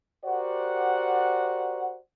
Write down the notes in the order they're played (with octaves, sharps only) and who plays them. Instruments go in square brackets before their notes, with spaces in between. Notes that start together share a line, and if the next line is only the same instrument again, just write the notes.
[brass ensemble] F#4 G4 A#4 C5 D5 F#5